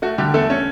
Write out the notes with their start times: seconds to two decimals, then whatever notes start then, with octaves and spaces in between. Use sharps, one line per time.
0.02 A3 F#4
0.18 D3 G3 G4
0.34 E2 A3 A4
0.50 C#4